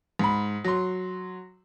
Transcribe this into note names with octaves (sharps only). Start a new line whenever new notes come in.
G#2 B5
F#3 C6